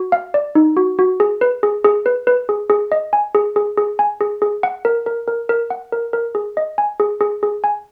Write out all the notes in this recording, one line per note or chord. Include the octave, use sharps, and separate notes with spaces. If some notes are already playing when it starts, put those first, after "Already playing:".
Already playing: F#4
F5
D5
D#4
F#4
F#4
G#4
B4
G#4
G#4
B4
B4
G#4
G#4
D#5
G#5
G#4
G#4
G#4
G#5
G#4
G#4
F#5
A#4
A#4
A#4
A#4
F#5
A#4
A#4
G#4
D#5
G#5
G#4
G#4
G#4
G#5